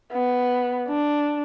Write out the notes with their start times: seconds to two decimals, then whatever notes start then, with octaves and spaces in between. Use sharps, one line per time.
0.12 B3
0.88 D4